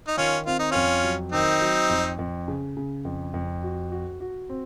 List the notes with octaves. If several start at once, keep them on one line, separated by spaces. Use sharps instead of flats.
D#4
D#3 C#4 F4
C4 F4
D#4
F2 C#4 F4
F#3
D#3 C4 D#4
F#3
F2
F2
C#3
C#3
F2
F2
F#4
F#4
F#4
C4